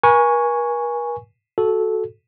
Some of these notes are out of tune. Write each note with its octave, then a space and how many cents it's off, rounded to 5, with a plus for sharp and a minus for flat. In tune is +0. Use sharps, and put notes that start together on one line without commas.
A#4 +45 G#5 -5 C#6 +0
F#4 +0 A4 -15